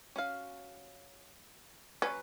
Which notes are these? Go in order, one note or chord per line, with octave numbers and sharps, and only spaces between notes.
C#4 F#4 F5
F#3 C#4 B4